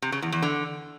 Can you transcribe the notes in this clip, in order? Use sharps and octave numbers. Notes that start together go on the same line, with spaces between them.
C3
C#3
E2
E2
D3